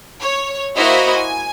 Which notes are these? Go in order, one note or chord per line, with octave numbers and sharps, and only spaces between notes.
C#5
A#3 E4 F#4 C5 D#5 E5
G#5